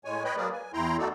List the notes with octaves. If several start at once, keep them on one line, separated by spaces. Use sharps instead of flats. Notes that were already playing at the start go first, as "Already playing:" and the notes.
A2 G#3 C#5 G#5
B4 C#5 D#5 G5 B5
F#3 A#3 G#4 A#4 B4 D5
G#5
E2 E4 G5 A#5 C6
A3 D#4 F#4 A4 D5